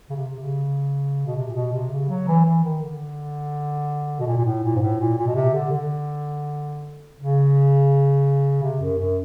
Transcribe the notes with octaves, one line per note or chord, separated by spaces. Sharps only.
C#3
C3
C#3
B2
C3
A#2
B2
C3
C#3
F#3
E3
E3
D#3
D3
B2
A#2
A#2
A2
A#2
G#2
A2
A#2
A#2
B2
C3
D3
D3
C#3
C3
F#2
F#2